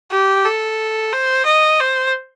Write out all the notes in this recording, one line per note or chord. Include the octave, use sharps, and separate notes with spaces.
G4
A4
C5
D#5
C5